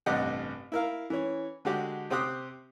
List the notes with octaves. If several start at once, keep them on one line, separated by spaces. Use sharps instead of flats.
A1 G2 C3 G4 D#5 F#5
E4 A#4 F5
E3 C#4
D3 G#3 F#4 G4
C3 C4 G4 D#6 F#6